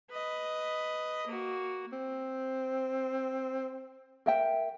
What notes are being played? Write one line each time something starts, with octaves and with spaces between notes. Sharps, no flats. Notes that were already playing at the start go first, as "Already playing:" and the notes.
B4 D#5
A#3 F#4
C4
A#4 E5 G5